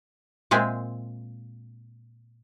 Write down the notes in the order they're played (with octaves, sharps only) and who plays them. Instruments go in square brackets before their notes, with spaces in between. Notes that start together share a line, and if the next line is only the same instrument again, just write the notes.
[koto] A#2 G#3 C4 G#4 E5